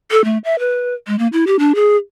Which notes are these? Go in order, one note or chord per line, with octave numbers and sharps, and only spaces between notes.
A4
A3
E5
B4
G#3
A#3
E4
G4
D4
G#4